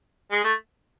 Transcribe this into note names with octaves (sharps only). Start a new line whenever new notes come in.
G#3
A3